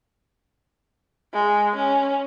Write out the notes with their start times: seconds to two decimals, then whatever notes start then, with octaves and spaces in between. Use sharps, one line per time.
1.34 G#3
1.76 C#4